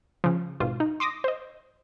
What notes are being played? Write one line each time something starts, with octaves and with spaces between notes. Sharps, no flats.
C#3 F3
G#1 B2 F4
D#4
C6 D6 D#6 A#6
C5 D#5